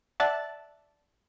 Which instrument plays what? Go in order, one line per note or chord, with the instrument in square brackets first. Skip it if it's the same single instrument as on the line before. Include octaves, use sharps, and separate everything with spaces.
[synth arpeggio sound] D5 E5 F#5 A5 F#6 A6